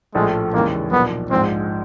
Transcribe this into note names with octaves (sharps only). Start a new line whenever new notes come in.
A#1 A2 F3 G#3 A3
D#2 C#3 E3 G#3 A#3
B1 A#2 F3 B3
A#1 G#2 F3 G#3 C4